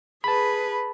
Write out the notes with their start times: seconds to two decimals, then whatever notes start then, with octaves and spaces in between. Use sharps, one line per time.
0.24 G#4 B4 A5 B5